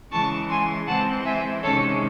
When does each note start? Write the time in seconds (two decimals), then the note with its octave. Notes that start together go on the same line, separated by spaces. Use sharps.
0.10 C#3 E3 G#3 A5 C#6
0.49 G#5 C6
0.87 E3 G#3 C4 F#5 A5
1.25 E5 G#5
1.63 C3 D#3 G#3 C#4 A4 C#5